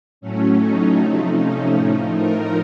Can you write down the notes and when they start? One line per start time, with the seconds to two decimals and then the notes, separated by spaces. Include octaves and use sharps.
0.21 A2 F#3 A3 C#4
0.59 D#4
0.97 C3 F3 A3
1.36 C#4
1.75 A2 F3 A3 D#4
2.13 A#4